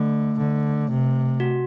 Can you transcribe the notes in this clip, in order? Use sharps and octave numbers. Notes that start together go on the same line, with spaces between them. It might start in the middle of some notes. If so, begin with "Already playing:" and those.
Already playing: D3 A3
D3
C3
F#4